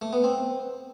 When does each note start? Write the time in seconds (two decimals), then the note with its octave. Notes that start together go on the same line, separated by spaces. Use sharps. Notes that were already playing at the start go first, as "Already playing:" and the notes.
0.02 A3
0.13 B3
0.24 C4